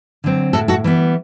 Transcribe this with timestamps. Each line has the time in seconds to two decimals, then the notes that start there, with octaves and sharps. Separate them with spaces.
0.24 D3 F#3 C4
0.53 A2 F#4 A4
0.68 F#4 A4
0.84 E3 G3 B3